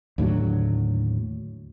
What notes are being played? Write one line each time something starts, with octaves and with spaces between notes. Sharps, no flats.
D#2 A2 D3 F#3